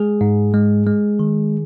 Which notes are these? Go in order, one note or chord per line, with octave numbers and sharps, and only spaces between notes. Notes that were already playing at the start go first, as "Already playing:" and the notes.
Already playing: G#3 G#4
G#2
G#3
G#3
D#3